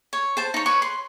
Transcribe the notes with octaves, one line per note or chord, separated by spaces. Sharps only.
C#5
C5 A5
D#4 C#5
B4 C#5 C#6
C6